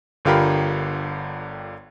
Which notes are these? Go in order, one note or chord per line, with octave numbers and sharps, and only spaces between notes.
G1 D3 F4 G4 A#4 B5